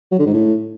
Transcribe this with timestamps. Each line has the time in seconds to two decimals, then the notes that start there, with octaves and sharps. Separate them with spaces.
0.12 F#3
0.19 D3
0.26 G#2
0.34 A2